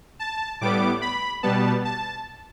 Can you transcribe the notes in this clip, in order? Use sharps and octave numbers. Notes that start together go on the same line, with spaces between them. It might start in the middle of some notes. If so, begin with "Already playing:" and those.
A5
A2 G3 B3 D6
B5
B2 G3 B3 A5
A5